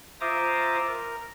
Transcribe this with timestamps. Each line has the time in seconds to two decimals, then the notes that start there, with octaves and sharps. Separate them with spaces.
0.21 F4 C5 E5 A#5 D6 D#6
0.87 A#4